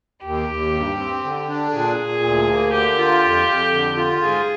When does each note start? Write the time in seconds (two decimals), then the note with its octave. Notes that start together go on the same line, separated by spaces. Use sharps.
0.24 D#2 G4
0.49 D#2
0.73 G2
0.98 C4
1.23 D3
1.48 D4
1.73 A#2 G#4
1.98 A#2
2.23 D2
2.48 A#3
2.72 D3 G4
2.98 F4
3.23 F2
3.48 F2
3.72 D3
3.97 F4
4.21 G#2 G#4